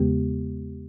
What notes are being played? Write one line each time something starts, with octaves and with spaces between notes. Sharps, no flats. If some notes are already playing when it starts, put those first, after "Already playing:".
Already playing: E2 C#3 G#3 B3 G4